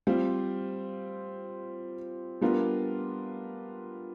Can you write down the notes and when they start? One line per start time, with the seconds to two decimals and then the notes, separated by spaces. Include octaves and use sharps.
0.07 G3 C4 F4
2.41 G3 B3 D4 F4 A#4